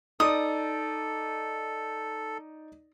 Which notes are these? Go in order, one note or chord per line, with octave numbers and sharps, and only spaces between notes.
D#4 A4 D5 D#6